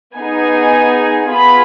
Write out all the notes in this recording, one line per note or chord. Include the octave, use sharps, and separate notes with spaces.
B3 D#4 G#4 G#5
B3 F4 G#4 B5